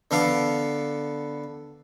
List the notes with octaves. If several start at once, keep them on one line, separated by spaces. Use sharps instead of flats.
D3 B3 A4 F5 D6